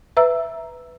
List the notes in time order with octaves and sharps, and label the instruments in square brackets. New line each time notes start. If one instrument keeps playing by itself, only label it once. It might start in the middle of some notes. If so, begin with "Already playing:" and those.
[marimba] B4 E5 A#5 E6